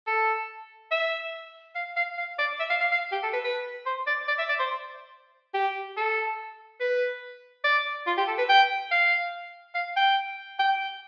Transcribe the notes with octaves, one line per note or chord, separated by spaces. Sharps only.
A4
E5
F5
F5
F5
D5
E5
F5
F5
F5
G4
A4
B4
B4
C5
D5
D5
E5
D5
C5
G4
A4
B4
D5
F4
G4
A4
B4
G5
F5
F5
G5
G5